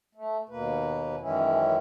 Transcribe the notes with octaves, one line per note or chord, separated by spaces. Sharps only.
A3
D#2 B2 A#3 B4
F#2 D#3 E3 G#3 C#4 E4